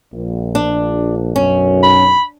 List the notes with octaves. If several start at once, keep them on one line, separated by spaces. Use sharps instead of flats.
A#1
D4
B1 F#2 C#4
B5